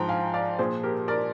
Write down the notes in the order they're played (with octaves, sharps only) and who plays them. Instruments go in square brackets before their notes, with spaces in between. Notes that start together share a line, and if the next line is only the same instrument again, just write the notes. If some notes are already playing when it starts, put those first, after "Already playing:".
Already playing: [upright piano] G#2 F3 G5 A#5
F5 G#5
D5 F5
A#2 F3 G#4 C5
G4 A#4
A#4 D5